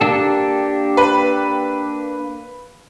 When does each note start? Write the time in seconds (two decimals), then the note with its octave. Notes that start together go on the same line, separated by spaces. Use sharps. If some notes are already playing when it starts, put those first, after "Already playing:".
0.01 A#3 D4 G4 A4
0.97 B4